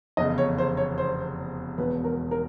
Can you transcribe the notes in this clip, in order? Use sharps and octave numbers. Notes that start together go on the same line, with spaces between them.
F1 E2 C#3 D#5
C#5
C5
C#5
C5
E1 E2 B2 B4
A#4
A#4